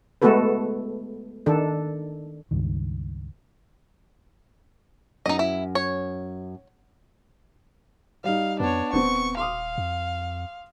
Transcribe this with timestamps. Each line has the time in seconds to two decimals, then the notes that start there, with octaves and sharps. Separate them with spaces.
0.22 G#3 A3 B3 F#4 A4 B4
1.46 D#3 D4 A4
2.51 C#2 G2 D#3
5.26 F#2 D#4 D#5
5.39 E4
5.75 C#5
8.24 G3 D#4 F5
8.60 F2 B3 D4 C#5
8.93 D#1 B3 C4 C#6
9.37 F5 C6 D6 D#6
9.78 F2